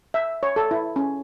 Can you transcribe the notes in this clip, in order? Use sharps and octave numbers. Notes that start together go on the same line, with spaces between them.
E5
C#5
A4
E4
C#4